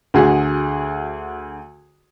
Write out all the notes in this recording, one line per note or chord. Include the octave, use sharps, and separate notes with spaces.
D2 F#4 G#4